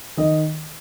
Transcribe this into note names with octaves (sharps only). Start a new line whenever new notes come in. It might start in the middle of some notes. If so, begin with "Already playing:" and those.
D#3 D#5